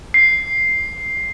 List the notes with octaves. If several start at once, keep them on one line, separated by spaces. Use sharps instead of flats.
C7